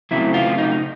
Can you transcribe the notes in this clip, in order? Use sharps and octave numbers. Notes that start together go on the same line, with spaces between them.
C#3 F#3 A3 C4 E4
F4
D#4